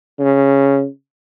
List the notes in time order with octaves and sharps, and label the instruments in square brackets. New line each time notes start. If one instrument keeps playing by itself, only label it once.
[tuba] C#3